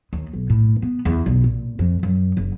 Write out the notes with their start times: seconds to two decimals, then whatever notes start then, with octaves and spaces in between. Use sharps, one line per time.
0.13 D#2
0.33 B1
0.50 A2
0.82 B3
1.05 E2
1.26 B1
1.44 A#2
1.79 F2
2.03 F#2
2.37 F#1